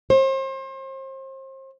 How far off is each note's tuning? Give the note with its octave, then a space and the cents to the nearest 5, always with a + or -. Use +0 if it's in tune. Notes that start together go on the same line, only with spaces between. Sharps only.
C5 +35